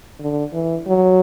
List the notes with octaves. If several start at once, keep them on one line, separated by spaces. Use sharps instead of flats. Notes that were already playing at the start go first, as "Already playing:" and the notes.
D3
E3
F#3